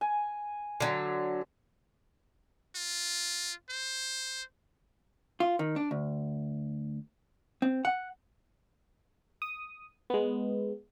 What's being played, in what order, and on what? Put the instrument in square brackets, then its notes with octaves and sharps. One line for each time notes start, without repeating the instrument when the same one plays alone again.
[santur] G#5
[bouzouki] D3 F#3
[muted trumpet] F4
C5
[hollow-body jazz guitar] F4
D#3
D4
D2
C4
F#5
[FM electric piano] D#6
G#3 B3